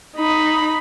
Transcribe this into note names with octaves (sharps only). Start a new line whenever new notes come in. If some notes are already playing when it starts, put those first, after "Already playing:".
D#4 B5